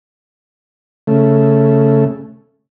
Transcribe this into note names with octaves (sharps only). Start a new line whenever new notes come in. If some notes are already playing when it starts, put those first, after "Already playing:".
C#3 A3